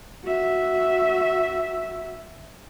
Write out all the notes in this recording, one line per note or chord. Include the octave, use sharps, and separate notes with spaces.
F#4 E5